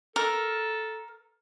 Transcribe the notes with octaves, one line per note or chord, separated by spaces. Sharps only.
A4 A#4